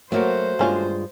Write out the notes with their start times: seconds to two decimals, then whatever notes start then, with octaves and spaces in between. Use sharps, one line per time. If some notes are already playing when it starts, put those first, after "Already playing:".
0.12 F#3 A3 A#3 F#4 A4 A#4 C5
0.59 G2 G#3 A#3 C#4 F4